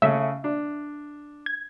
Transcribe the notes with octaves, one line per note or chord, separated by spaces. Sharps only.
C#3 A3 C#4 E5
D4
G#6